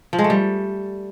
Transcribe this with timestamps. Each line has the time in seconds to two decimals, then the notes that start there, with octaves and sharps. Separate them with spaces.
0.13 F3
0.19 G#3
0.24 A3
0.30 G3